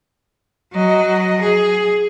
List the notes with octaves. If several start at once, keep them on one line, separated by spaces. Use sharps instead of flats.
F#3 D#5
G#4